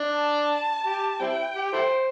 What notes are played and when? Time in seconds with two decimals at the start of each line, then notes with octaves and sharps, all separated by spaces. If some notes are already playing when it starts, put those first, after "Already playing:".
Already playing: D4
0.16 A5
0.86 G4
1.20 G3 C4 E4 G5
1.56 G4
1.73 E4 A4 C5